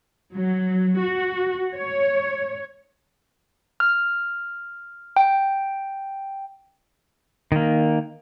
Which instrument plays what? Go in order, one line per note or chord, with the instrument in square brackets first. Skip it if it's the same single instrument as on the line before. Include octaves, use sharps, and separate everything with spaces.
[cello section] F#3
F#4
C#5
[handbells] F6
G5
[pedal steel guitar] D#3 A#3